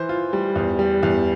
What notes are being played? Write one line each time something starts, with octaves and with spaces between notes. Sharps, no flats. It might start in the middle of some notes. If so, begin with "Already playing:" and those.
Already playing: E3 C5
F4
G3
E2
G3
E2